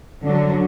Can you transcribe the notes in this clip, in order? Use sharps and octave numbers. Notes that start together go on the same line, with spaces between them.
D3 F#3